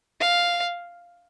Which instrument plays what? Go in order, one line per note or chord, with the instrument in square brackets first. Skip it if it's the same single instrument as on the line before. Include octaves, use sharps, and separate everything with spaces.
[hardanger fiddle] F5